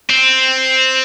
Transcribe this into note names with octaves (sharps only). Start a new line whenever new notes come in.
C4